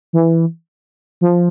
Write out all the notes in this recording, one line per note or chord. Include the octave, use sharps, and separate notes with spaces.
E3
F3